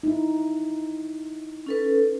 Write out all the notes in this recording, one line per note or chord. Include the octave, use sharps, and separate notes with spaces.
D#4 E4
C#4 A4 B4